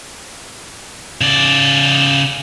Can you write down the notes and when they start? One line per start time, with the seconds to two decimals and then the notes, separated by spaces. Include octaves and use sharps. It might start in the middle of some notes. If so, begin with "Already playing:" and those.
1.21 C#3 D5